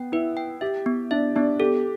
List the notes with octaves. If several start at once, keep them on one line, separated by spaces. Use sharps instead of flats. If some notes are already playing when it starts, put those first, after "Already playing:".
Already playing: B3 G5
E4 B4
G5
G4 E5
B3
D4 E5
B3 D4
G4 A4